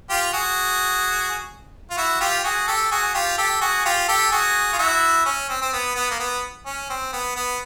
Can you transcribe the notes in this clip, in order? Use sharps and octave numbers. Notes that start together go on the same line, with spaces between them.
F4 G4
F#4 G#4
F4
E4 F#4
F4 G4
F#4 G#4
G4 A4
F#4 G#4
F4 G4
G4 A4
F#4 G#4
F4 G4
G4 A4
F#4 G#4
F4
E4 F#4
C#4
C4
C4
B3
B3
A#3
B3
C#4
C4
B3
B3